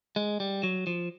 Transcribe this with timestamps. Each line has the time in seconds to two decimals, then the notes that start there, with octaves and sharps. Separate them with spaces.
0.16 G#3
0.40 G3
0.63 F#3
0.87 F3